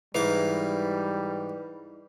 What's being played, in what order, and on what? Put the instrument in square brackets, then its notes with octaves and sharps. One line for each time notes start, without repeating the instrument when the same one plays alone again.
[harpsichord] G#2 E3 D6 [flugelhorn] G3 [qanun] D#4 E4 [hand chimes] B4